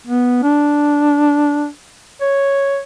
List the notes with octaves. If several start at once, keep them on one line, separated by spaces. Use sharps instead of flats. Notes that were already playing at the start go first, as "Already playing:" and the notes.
B3
D4
C#5